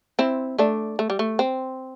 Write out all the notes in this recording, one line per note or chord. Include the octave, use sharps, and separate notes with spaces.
C4 E4
A3 D4
A3
G3
A3
C4